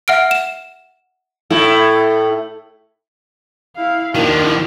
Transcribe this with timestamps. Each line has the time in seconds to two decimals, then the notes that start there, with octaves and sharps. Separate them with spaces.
0.08 E5 F#5 F6 D7
0.31 E7
1.50 A2 A3 E4
3.76 E4 F5
4.15 D#2 D#3 F3 A#3 D4 E4 F#4